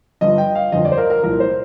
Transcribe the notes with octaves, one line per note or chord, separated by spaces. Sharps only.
G1 G2 F3 D#5
G5
F5
G1 F2 D3 F3 D#5
D5
C5
A#4
A#4
C2 A#2 F3 A#4
C5